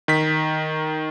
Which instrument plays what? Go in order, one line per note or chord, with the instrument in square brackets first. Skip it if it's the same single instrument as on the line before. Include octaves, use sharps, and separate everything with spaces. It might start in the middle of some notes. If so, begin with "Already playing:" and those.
[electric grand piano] D#3 B6